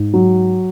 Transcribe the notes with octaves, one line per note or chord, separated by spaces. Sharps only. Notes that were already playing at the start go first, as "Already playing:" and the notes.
Already playing: G#2
F#3